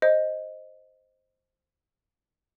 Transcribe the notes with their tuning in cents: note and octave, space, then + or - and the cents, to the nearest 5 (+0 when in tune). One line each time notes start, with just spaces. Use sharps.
C5 +0 D#5 +0